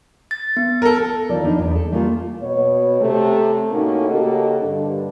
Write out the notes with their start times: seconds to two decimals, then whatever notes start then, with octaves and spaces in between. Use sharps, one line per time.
0.31 A6
0.57 B3
0.82 A4 A#4
1.29 D#3 F3 D5
1.44 B3 D4 D#4
1.59 E2 G#2
1.75 A4
1.92 G3 A3 A#3 C#4 D4 F4
2.41 B2 C#5
3.00 C3 A3
3.70 A2 A#3 C#4 D#4 F#4 A4
4.09 C#3 A#3 F#4 G4 A4 D#5
4.61 G2 D3 D4